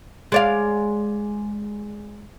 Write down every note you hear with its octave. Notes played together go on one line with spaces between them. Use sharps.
G#3 D5 F5